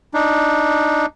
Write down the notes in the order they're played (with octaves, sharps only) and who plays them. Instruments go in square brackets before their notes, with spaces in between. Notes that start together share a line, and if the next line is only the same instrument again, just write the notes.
[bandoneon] D4 D#4